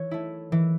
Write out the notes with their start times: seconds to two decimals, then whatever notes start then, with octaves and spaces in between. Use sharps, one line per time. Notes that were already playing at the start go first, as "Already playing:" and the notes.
Already playing: E3 C#5
0.11 A3 E4
0.52 E3